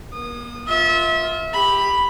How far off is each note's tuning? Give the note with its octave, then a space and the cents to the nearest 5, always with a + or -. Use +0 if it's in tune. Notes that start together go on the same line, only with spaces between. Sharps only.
A#3 +40 D#6 -20
F4 +0 E5 -30
G4 +15 B5 +0